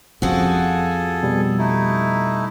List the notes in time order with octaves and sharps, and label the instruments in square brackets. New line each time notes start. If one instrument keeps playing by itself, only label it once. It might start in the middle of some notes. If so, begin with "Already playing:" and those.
[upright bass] F2 C#4 [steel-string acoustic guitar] F3 F#4 [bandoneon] G#4 A4
[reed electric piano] B2 G3
[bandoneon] A3 D#4 E4